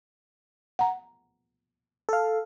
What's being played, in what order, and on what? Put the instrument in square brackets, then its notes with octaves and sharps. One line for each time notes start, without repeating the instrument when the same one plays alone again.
[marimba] F#5 A#5
[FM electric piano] A4 F5